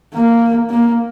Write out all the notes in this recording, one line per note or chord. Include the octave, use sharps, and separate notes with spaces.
A#3
A#3